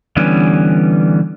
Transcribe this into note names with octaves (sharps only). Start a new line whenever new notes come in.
D3 E3 G3 B3 C#4